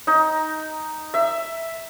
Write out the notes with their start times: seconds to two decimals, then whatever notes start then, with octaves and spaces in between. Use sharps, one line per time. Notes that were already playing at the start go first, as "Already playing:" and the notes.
0.07 D#4
1.14 E5